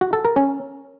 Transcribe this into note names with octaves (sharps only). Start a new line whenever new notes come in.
F#4
A4
A#4
C#4